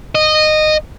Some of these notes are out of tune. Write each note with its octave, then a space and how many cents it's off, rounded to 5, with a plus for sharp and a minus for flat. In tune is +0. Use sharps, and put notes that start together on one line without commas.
D#5 -15